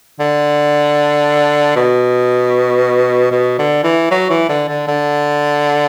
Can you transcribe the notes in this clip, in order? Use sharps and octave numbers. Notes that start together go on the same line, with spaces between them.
D3
B2
B2
D3
E3
F#3
E3
D3
D3
D3